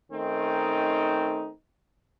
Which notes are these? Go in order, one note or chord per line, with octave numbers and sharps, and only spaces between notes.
D#3 A3 C4 C#4 D#4